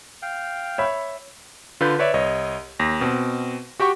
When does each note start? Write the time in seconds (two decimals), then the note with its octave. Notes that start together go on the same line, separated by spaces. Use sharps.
0.22 F5 G5
0.78 C#5 E5 B5
1.81 D3 F4 B4 G6
1.99 B4 C#5 D5 E5
2.14 C2 C#5 D#5
2.80 D#2 A#6
3.01 B2 C4
3.80 F#4 G4 G5 C#6